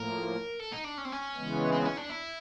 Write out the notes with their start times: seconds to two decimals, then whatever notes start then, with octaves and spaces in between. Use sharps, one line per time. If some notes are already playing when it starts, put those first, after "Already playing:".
Already playing: A2 F3 A#3 A#4
0.59 A4
0.72 D#4
0.84 D4
0.98 C#4
1.05 C4
1.12 C#4
1.34 C#3 E3 G#3 B3
1.72 C4
1.85 C#4
1.97 D4
2.10 E4